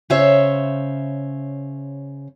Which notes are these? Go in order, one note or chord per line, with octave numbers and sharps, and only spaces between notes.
C#3 C5 C#5 E5 F5